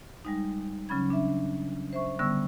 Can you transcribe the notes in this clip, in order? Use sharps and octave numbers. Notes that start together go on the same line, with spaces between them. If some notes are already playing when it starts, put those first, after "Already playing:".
G3 G#3 D#4
C#3 F#3 C#4 B5 G#6
D4 E5
C5 E5 C#6
D3 G3 B3 C#6 E6